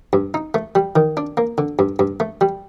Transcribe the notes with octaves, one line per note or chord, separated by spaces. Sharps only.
G2
D#4
A3
G3
D#3
D4
A#3
D3
G2
G2
A3
G3